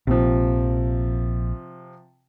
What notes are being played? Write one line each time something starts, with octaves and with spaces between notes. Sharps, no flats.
A#1 C3 F3